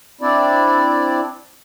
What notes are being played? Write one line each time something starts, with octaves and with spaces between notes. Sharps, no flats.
C4 D4 E4 D5